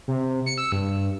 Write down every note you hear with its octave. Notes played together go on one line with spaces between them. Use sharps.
C3
C#7
E6
G2